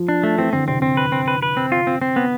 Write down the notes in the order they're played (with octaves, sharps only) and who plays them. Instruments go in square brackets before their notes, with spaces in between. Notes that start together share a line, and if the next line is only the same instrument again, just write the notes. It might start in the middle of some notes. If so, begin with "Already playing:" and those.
Already playing: [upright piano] F3
[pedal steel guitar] D4
A3
[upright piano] E3 [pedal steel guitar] C4
[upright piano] D3 [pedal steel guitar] C4
[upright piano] C3 [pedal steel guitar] C4
[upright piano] C3 [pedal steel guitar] C4
[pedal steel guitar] B4
C4
B4
B4
C4
F4
C4
C4
B3